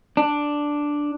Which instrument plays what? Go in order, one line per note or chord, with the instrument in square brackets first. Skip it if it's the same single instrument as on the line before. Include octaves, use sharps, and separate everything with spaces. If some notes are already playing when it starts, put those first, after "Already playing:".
[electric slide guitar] D4